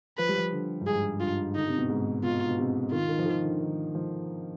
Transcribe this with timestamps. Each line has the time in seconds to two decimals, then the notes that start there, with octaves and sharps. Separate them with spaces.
0.18 F3 B4
0.28 G3
0.38 F3
0.52 D3
0.81 G2
0.86 G#2 G#4
1.20 G2 F4
1.55 D3 D#4
1.67 C3
1.78 B2
1.89 G#2
2.23 B2 F4
2.49 B2
2.58 C3
2.92 D#3 F4
3.09 D#3
3.19 F3
3.26 D#3
3.43 D3
3.60 D#3
3.95 F3